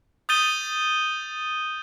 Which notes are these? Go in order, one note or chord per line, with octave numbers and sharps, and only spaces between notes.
D#6 G6 A6 D#7 G7